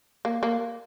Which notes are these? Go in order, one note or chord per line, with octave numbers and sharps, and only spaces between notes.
A#3
A#3